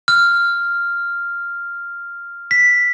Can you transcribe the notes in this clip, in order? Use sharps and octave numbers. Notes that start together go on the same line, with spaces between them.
F6
B6